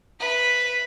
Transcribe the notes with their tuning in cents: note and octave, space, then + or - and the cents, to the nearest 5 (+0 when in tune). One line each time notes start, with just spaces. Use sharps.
B4 +0 E5 +0